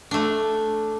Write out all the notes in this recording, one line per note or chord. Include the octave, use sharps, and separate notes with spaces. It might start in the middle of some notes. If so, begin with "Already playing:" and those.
A3 D4